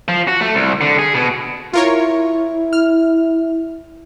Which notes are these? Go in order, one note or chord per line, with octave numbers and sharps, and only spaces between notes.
F3
F#4
A3
C2
D3
G#4
B2
E4 F4 A#4 C#5
F6